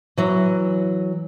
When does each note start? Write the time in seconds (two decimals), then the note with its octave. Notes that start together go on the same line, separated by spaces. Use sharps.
0.17 E3 F#3